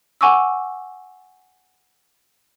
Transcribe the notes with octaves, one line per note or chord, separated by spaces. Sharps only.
F#5 G#5 C#6 D6 E6